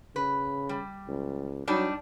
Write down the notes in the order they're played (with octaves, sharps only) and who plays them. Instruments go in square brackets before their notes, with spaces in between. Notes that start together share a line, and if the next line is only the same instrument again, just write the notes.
[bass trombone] C#3 [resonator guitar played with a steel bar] B4
[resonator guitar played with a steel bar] G3
[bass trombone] C#2
[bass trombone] F#3 [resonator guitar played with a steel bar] G3 D4 D#4